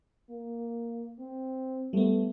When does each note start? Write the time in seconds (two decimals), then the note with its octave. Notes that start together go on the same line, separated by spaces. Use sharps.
0.29 A#3
1.20 C4
1.93 G3 A3 B3